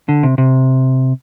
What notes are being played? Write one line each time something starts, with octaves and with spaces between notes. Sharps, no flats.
D3
C3
C3